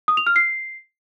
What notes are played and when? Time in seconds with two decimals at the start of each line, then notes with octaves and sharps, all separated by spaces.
0.08 D#6
0.17 F7
0.27 F6
0.36 C7